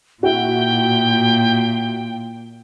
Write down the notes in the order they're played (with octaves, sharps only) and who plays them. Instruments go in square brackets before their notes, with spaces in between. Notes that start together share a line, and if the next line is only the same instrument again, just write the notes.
[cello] A#2 [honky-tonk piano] E4 F#4 [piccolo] G5